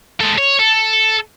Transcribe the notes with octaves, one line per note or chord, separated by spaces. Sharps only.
G#3 A4
C#5
A4